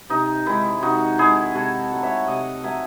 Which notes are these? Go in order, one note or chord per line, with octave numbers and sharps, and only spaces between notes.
C3 D#4
D#3 G#3 E4
C3 D#4 F#4
D#3 G#3 E4 G#4
C3 F#4 A4
F#3 A3
C#5 E5
C3 D#5 F#5
F#3 A3 E5 G#5